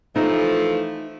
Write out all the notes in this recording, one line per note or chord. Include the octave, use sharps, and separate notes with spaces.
E3 F3 A3 D#4